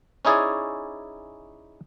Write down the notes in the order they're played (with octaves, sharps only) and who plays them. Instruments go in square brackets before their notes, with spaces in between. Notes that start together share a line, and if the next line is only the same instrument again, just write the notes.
[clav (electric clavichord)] C#4 D#4 E4 G#4 C#5 D5